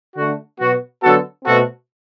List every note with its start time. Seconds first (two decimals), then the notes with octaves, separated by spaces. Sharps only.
0.17 D3 A3 D4 F#4
0.59 B2 F#3 B3 F#4
1.02 D3 F#3 B3 F#4 A4
1.45 B2 A3 C4 F#4 A4